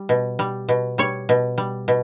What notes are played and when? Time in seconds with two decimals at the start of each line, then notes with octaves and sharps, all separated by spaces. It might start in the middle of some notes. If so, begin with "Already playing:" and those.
Already playing: G3
0.09 B2
0.39 G3
0.69 B2
0.98 G3 C#5
1.29 B2
1.58 G3
1.88 B2